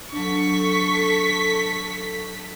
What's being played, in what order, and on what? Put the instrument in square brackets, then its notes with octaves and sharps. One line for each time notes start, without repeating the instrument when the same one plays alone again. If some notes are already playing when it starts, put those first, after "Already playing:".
[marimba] F#3 D4 [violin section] A4 B6 [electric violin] C#6